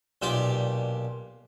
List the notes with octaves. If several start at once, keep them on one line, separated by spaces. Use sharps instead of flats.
B1 A#2 G4 D5